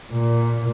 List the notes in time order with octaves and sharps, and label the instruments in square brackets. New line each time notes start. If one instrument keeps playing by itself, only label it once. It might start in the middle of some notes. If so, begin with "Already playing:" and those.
[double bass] A#2